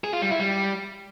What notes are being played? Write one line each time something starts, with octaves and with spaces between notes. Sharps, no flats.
G#4
F4
G3
E4
G3